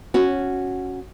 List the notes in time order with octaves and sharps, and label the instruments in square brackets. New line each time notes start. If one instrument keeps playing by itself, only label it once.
[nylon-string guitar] C#4 F#4